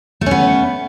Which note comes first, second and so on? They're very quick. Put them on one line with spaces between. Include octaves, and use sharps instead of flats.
A3 C#4 B3